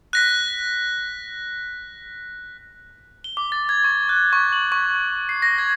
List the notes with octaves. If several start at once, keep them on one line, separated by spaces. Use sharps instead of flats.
F#6 A#6 B6
G7
D6
A6
G#6
C#6
F#6
C#6
F#7
C#6
C7
A#6
G#6